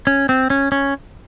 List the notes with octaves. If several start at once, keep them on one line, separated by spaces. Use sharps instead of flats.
C#4
C4
C#4
C#4